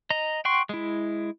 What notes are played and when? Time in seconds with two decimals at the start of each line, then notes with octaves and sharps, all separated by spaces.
0.10 D#5 A#5
0.45 F#5 G5 C6 C#6
0.69 G#3 E4